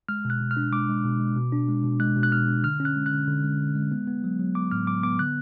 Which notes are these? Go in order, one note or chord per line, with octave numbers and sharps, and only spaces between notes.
G#3 F6
B2 F#6
B2
F6
D4
G#3 D6
G#3
B2
G#3
B2
D4
G#3
B2
G#3 F#6
B2
F#6
B2 F6
D4
D3 F6
C#4
F#6
G#3
F#6
D3
D3
G#3
D3
G#3
B3
B3
F#3
F#3
B3 D6
A2 F6
F#3 D6
B3 D6
D3 F#6